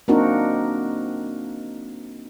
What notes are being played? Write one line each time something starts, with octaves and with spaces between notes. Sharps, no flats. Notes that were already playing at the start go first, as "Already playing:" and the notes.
A#3 C4 D4 D#4 F#4 A#4